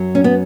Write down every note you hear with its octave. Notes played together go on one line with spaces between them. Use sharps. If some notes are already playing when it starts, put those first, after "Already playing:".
Already playing: F#2 F#3
C#4
B3